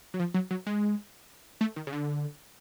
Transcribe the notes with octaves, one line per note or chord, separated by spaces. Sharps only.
F#3
F3
F#3
F#3
G#3
A3
D#3
C#3
D3